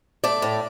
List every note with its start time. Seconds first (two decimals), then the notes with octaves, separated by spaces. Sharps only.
0.24 A3 D5
0.42 A2